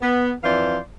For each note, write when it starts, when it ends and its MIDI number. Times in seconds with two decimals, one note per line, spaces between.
0.02 0.32 59
0.43 0.77 41
0.43 0.77 52
0.43 0.77 72
0.43 0.77 74
0.43 0.77 77